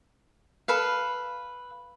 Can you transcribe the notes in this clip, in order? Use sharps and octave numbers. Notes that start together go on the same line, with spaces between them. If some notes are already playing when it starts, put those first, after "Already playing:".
A4 B4 F5